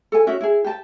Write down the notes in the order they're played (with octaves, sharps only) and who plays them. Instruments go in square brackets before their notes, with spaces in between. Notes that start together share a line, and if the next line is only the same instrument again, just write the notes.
[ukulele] A4 G#5
C#4 E4 F#4 E5
E4 G#4
G4 A5